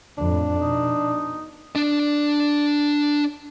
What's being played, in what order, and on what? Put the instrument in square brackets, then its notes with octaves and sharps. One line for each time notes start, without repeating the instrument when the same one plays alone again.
[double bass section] F2 A2 [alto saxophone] D4
[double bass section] B2 [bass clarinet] D#4
[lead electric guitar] D4 D5